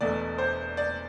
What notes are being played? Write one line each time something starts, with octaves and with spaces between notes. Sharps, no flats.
E1 E2 B2 A3 D5
C5
D5